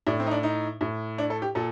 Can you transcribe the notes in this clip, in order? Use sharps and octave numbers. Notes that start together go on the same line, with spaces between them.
A2 D4
C4
D#4
D4
D#4
A2
D4
A4
G4
A#2 A4